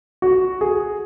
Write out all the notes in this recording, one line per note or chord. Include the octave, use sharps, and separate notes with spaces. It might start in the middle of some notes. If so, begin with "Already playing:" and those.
F#4
G#4